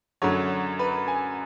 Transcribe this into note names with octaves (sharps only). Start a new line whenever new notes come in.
F#2 D3 F#3 C#5
B4
G#5